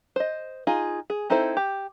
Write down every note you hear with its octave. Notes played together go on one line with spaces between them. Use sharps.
C5 D#5
D#4 F4 G#4
G#4
C4 D#4 E4 A4 C5
G4